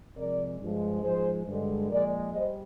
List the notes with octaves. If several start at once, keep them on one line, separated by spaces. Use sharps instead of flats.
C3 F3 G#3 A#4 D5
G2 F3 G#3
G#2 F3 G#3 G#4 C5
G2 D3 G#3
A#2 F3 G#3 A#4 D5
G3 C5 D#5